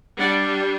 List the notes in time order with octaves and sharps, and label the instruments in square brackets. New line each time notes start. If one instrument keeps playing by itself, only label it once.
[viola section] G3 D4 D5 F#5